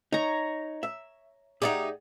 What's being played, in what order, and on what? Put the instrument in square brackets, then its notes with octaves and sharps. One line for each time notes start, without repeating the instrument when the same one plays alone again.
[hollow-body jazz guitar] D#4 [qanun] C#5 A#5
[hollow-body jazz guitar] E5
[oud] D#4 E4 G4 [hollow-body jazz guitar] G#4 D5 F#5